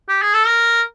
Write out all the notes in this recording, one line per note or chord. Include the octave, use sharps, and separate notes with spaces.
G4
G#4
A4
A#4